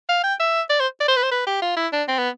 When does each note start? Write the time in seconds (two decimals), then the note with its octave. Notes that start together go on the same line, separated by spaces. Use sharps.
0.09 F5
0.23 G5
0.40 E5
0.69 D5
0.80 C5
1.00 D5
1.08 C5
1.16 B4
1.23 C5
1.31 B4
1.47 G4
1.62 F4
1.76 E4
1.92 D4
2.08 C4
2.18 B3